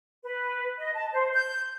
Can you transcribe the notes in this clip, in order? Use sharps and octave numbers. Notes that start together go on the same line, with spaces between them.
B4
D#5
A5
C5
G6